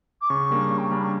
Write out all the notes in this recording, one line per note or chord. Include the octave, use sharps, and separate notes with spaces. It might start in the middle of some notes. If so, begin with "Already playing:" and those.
D6
C#3 C#6
G3 A#3 D4
C#3
G5
A#5
G3 A#3 D4 B5
C#6